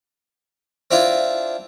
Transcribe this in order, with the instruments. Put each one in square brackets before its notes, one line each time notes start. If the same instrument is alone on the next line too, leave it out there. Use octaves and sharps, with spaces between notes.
[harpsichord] C4 D4 E4 F4